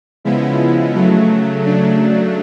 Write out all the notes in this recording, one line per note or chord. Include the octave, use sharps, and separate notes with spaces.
C#3 F3 G#3 B3 E4
C#3 F#3 A3
C#3 F#3 A3 D4